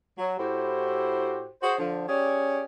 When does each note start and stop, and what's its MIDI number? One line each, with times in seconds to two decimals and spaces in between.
0.18 0.37 54
0.38 1.48 45
0.38 1.48 64
0.38 1.48 66
0.38 1.48 67
0.38 1.48 72
1.62 1.75 66
1.62 1.75 68
1.62 1.75 72
1.78 2.06 50
1.78 2.06 53
2.08 2.63 61
2.08 2.63 67
2.08 2.63 68
2.08 2.63 73
2.08 2.63 74